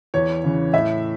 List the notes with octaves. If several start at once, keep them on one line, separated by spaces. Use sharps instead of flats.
E2 C#5
C#3 E3
A2 E5